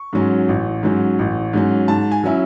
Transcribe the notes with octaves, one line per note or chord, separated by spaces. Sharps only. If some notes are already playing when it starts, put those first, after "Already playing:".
Already playing: C#6
G#2 F#3 C#4
A1
G#2 F#3 C#4
A1
G#2 F#3 C#4
G#2 A5
G#5
F#3 C#4 E4